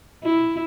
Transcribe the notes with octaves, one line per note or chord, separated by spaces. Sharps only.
E4